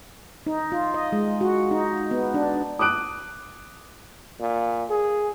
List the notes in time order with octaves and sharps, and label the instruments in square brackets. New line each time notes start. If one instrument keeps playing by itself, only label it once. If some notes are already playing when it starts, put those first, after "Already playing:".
[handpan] D#4
F4
D#5
G#3
F#4
D#4
B3
D4
[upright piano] D6 D#6 F#6 D7
[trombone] A#2
G#4